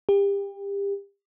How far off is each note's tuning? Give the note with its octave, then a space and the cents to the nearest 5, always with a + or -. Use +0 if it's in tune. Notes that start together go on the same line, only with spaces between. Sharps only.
G4 +30